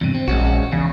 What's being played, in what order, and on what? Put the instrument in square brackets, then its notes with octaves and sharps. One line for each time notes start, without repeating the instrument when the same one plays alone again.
[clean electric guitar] E2 G2 C3
C4
[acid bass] A#1 [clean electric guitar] G#3 C#4 F#4
[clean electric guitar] E2 [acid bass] C#3